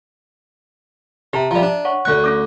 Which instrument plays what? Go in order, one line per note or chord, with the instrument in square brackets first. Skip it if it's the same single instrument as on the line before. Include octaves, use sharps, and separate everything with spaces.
[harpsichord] C3 [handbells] G4 A5 A#5
[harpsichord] F3 G3 [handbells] E5 A#5
[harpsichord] D4
[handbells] C#5 F#5 C#6
[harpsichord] D2 C#6 [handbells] A3 F#6
[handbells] A3 C#4 D6